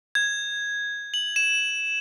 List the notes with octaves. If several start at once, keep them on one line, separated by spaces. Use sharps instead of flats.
G#6
F#7
E7